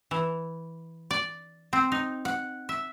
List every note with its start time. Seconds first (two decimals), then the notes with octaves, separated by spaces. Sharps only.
0.11 E3
1.11 D5
1.73 C4
1.92 D#4
2.25 F#5
2.69 E5